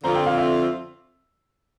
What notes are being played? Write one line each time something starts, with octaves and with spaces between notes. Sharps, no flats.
F2 D3 F3 C4 F4 A#5
G5
F5
E5